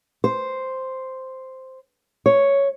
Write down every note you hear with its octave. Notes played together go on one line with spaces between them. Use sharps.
C5
C#5